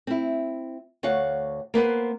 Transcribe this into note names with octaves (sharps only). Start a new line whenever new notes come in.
C4 E4
D2 C#5 F5 F#5
A#3 B3 B4 C5